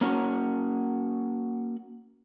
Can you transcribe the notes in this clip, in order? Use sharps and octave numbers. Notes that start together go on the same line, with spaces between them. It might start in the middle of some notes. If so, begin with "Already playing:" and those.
A#3 C#4 F#4 C#5